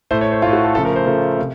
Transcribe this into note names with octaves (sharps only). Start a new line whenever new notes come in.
A2 A3 C5
C#5
C5
A2 A3 F4
F#4
A4
C#3 F3 A3 A4
A#4
C5
C#3 F3 A3 A4
C3